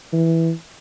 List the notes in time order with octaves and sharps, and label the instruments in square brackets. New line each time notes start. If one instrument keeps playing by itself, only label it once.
[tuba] E3